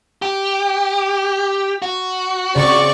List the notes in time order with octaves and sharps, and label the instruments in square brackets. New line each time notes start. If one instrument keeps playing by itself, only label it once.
[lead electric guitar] G4
F#4
[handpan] C#3 [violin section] C4 D5 C#6